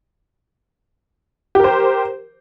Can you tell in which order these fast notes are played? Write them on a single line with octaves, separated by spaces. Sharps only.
G4 A#4 C5